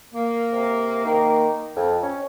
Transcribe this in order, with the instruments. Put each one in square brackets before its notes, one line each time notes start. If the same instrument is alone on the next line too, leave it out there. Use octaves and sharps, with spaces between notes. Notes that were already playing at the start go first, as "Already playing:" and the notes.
[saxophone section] A#3
[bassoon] C3
D#3
F2
C#4